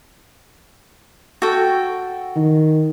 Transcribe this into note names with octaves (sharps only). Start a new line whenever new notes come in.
F#4 A4 G5
D#3